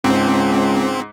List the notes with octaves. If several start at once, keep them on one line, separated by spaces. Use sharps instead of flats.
C#2 G#2 C4